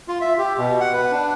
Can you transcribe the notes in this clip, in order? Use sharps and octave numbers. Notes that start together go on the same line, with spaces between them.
F4
E5
G4
B2
F#5
B4
D4